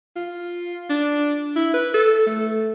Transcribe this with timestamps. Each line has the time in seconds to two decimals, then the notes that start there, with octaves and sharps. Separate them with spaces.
0.16 F4
0.90 D4
1.56 E4
1.74 B4
1.94 A4
2.27 A3